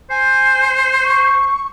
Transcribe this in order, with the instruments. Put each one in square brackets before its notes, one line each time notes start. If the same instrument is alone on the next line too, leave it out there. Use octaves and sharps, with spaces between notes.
[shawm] C5 [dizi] G#5
[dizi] C#6